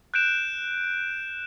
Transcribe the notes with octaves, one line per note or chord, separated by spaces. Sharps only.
F#6 G6 D7 E7